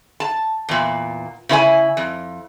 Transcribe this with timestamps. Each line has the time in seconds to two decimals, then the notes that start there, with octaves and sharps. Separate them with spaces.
0.20 A5
0.69 E2 A#2
1.49 C#3 E4 C5 G#5
1.97 F2